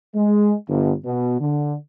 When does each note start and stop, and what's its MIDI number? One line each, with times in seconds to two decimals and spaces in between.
0.15 0.53 56
0.69 0.94 31
1.06 1.36 47
1.41 1.75 50